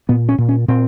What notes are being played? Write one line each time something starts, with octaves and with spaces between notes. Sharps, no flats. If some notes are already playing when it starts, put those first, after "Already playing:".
A#2 B3
C#4
A#2
C#4
A#2 C4